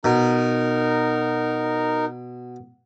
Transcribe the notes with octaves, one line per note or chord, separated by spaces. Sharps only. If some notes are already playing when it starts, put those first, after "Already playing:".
B2 D#4 A#4